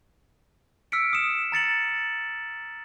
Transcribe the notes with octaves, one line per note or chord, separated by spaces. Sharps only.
E6 F6 B6 C#7 D7
D#6 C#7 E7
A#5 A6 C#7 F#7